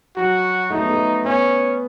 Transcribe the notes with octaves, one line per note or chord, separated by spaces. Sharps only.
F#3 F#4
A3 D#4
B3
A3
B3 C#4